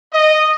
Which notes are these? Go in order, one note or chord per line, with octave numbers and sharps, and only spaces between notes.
D#5